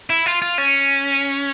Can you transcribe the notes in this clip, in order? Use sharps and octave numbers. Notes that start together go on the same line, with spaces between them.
E4
F4
F4
C#4